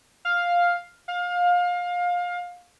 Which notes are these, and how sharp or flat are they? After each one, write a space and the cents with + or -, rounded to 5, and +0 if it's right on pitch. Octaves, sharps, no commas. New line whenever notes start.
F5 +5
F5 +25